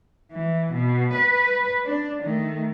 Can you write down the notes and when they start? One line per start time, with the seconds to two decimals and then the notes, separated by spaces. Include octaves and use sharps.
0.32 E3
0.73 B2
1.13 B4
1.85 D4
2.21 D#3 A3